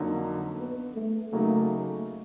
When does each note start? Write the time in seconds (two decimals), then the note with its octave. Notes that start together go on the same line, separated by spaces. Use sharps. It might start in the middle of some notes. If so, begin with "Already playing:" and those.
Already playing: F2 D3 F#3 A#3 D#4
0.58 B3
0.96 A3
1.33 C#3 F#3 A3 A#3 D#4